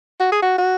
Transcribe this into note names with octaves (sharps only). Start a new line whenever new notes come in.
F#4
G#4
F#4
F#4